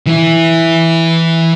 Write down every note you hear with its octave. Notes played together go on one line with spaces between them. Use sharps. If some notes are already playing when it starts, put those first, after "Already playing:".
E3 E4